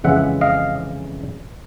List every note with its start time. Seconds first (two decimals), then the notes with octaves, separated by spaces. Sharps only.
0.04 F2 C#3 E3 G#3 E5 F#5
0.41 D#5 F5